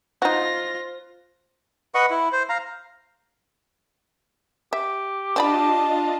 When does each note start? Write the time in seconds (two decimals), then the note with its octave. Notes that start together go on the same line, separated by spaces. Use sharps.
0.22 D#4 F4 F#4 C5 A#6
1.95 B4 D#5 F#5 C#6
2.10 E4
2.32 C5
2.49 F5 A#5
4.73 G4 E5
5.36 C4 D4 F4 D5 D#5 A5 B5